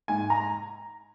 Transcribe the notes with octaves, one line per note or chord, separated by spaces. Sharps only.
G#2 G#5
A#5